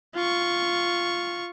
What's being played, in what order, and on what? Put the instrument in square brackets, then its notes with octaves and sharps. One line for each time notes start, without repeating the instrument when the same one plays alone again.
[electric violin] F4 C#6